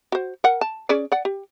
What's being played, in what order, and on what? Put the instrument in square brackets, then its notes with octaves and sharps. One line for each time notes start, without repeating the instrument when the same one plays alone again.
[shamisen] F#4 C5
A#4 F#5
A5
C#4 G#4 D5
D5 F#5
G4